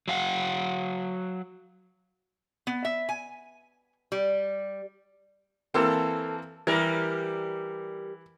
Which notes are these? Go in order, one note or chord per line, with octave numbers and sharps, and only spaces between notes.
F#3 F5 F#5
B3
E5
G#5
G3
E3 A#3 C4 A4
E3 G3 A#4